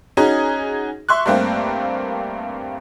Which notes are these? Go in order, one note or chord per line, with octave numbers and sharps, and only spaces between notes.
C#4 D#4 F#4 G#4
E5 C6 C#6 F#6
G2 A3 A#3 C4